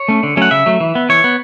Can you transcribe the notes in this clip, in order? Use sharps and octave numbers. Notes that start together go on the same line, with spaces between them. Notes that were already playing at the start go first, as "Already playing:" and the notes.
Already playing: C#5
A3 C#4
D3
F#3 A3 C#4 F#5
C#3 E5
F#3 A3
E3
B3
E3 C#5
B3